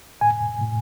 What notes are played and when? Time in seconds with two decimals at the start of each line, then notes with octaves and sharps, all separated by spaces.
0.21 A2 G#5
0.61 A2